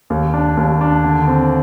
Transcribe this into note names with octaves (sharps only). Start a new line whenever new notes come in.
D#2
D4
D#2
D4
D3
C4